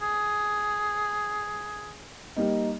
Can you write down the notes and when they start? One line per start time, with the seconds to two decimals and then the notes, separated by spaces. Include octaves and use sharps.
0.02 G#4
2.36 G3 A#3 D#4